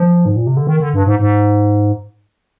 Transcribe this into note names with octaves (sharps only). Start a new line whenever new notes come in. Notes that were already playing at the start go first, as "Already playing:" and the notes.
Already playing: F3
G#2
A#2
C3
D3
D#3
D3
G2
G#2
G#2